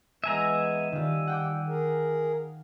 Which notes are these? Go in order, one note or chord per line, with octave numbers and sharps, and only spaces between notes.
E3 G#3 B3 E5 G#5 A#5
D#3 G3 F4
F#5 G5 D6
G#4 A#4